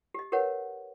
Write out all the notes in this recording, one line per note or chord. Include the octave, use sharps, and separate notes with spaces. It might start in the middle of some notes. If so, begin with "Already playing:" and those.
G4 D#5
G4 A#4 B4 C#5 F#5